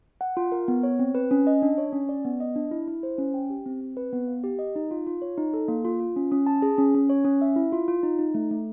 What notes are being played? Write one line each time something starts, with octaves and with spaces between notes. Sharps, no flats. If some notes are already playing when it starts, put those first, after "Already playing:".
F#5
F4
A#4
B3
C#5
C4
B4
C#4
D#5
D4
C#5
C#4
D5
B3
D#5
D4
E4
E4
C5
C#4
G5
G4
C4
C4
B4
B3
F5
G4
D#5
D#4
F4
F4
C#5
D#4
A4
A#3
F4
F4
C#4
C#4
A5
G#4
C#4
C#4
C#5
C#4
E5
E4
F4
F4
D#4
D#4
A3
A3